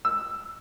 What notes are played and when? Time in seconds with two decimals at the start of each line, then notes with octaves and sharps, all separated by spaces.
0.05 E6